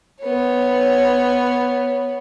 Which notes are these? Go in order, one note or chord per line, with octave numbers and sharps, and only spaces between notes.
B3 C#5